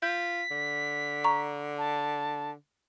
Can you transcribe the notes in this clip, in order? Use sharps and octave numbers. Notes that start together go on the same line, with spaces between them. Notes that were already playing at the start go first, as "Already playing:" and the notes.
F4 G6 B6
D3
A#5 C#6
A5